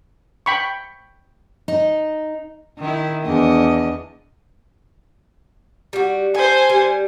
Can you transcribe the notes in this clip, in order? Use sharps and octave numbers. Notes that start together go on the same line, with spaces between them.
G5 B5 C#6
D#4
D#3 E4
E2 D4 D#5
G3 F#4
A4 C5 G#5
G3